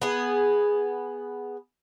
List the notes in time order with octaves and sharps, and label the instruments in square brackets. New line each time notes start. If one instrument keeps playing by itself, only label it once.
[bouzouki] B3 G#4